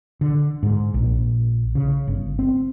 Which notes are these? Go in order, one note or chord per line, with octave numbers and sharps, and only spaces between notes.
D3
G#2
A#1
C#3
G1
C4